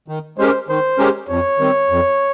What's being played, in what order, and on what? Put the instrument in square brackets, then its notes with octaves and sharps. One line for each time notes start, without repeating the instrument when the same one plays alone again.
[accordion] D#3
[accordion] G#3 C#4 G4 A#4 [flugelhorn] C5
[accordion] D#3 [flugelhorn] C5
[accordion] G#3 C#4 G4 A#4
[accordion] F2 [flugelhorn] C#5
[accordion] D#3 G3 C4
F2